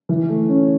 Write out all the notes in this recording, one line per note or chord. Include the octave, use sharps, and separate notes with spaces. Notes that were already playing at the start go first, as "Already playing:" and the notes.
E3
A3
C#4